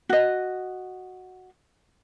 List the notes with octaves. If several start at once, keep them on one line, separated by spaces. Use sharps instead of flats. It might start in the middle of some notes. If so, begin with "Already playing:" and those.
F#4 D#5